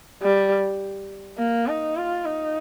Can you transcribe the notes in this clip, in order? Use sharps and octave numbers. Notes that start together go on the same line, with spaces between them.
G3
A#3
D#4
F4
D#4